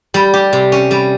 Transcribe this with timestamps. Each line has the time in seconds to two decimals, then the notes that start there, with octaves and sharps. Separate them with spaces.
0.14 G3
0.34 G4
0.53 C3
0.72 C#4
0.91 G3